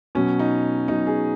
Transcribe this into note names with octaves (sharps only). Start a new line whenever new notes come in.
B2 F#3 C#4
D#4
B2 F#3 D#4
G#4